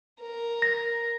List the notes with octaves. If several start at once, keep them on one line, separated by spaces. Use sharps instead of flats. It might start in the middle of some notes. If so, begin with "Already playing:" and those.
A#4
A#6